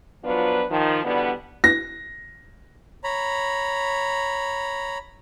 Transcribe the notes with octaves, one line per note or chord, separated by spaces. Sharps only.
F3 F#3 B3 D4 F4 B4
D#3 F3
B2 D3 E3 G3 B3
A#6
C#5 A#5 B5